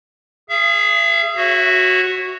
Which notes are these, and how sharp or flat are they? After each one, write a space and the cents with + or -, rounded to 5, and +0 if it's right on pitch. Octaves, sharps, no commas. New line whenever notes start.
G#4 +0 E5 +40
F#4 +0 C#5 -25 E5 +5